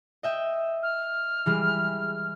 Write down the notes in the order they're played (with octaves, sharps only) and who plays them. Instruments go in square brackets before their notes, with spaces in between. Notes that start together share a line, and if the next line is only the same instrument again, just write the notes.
[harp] D#5 E5 G5
[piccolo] F6
[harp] E3 G3 G#3